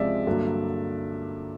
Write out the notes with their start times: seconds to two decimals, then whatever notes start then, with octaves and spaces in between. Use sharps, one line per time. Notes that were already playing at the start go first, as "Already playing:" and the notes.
Already playing: C#2 C3 F3 G#3 D5 E5
0.27 G2 D3 F#3 A#3